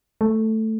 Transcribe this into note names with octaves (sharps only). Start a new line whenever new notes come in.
A3